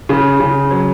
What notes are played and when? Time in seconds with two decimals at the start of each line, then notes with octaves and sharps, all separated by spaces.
0.09 C#3
0.40 C#3
0.71 F#3